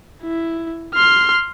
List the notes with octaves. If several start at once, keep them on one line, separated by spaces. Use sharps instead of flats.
E4
C6 F6